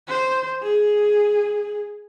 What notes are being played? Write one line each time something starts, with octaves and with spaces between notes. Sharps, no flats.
C5
G#4